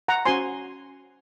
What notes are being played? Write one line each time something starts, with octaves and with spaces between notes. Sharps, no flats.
F#5 A#5
C#4 F#4 C5 G#5 C6